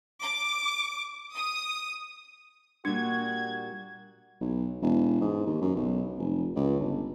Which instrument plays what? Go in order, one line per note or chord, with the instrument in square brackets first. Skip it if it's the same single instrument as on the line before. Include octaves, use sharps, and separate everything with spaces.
[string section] D6
D#6
[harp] A#2 G3 [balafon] D4 [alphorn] F#4 [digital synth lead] G#6
[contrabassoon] B1
E1
G#2
D#2
F#2
B1
F1
C#2
G1